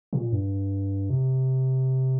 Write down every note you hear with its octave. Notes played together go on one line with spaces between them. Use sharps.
A#2
G2
C3